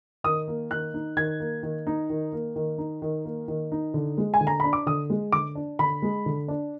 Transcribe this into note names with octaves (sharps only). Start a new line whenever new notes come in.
D#3 D#6
A#3
D#3 F#6
D#4
D#3 G#6
A#3
D#3
D#4
D#3
A#3
D#3
D#4
D#3
A#3
D#3
D#4
D3
G#3
G#5
D3
A#5
D4 B5
D6
D3 D#6
G#3
D3 D6
D4
D3 B5
G#3
D3
D4